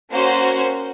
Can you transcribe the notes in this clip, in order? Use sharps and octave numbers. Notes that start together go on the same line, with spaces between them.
A#3 C#4 F#4 C5